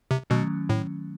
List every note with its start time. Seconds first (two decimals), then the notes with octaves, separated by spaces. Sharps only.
0.11 C3
0.30 B2 D#3 F#3 A3 C#4
0.69 A2